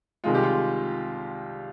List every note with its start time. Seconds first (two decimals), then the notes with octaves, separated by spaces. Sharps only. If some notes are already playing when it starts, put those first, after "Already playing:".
0.24 C2 C3 D#3 G#3 F4
0.34 G4
0.43 F4